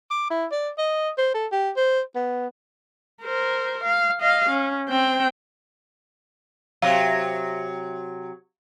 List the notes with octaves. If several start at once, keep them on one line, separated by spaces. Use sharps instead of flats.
D6
E4
D5
D#5
C5
A4
G4
C5
B3
A#4 C5
F5
D#5 F5
C#4
C4 G5
C3 F#3 F5